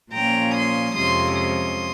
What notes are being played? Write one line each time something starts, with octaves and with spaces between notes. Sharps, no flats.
A#2 F3 A#3 C#4 G5 A#5
C6 D#6
F2 C3 F3 G#3 C#4 C6 D#6
C6 D#6